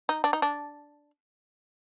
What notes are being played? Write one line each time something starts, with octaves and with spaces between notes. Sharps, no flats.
D#4
D4
D#4
D4